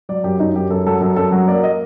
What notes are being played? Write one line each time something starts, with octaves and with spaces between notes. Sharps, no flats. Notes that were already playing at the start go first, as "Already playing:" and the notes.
F#3 D5
F#2 G4
F#2 D#4
F#2 G4
F#2 A4
F#3 A4
F#2 A4
F#2 A4
F#3 F#4
A#3 D5
D#5